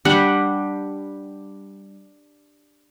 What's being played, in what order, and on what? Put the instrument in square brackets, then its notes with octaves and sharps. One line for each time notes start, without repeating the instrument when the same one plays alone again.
[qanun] G3 D4 F#5